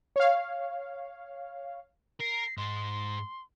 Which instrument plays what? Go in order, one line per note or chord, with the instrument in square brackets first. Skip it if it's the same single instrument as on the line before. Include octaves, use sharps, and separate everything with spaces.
[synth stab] C#5 F5
[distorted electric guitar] A#4 [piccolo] C7
[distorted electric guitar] G#2 G#3 [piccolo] C6